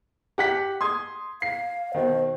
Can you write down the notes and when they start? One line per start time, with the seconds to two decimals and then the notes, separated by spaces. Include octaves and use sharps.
0.38 G4 F#5 B6
0.81 C6 D#6 G#6
1.42 F5 C7
1.94 B2 D#3 C5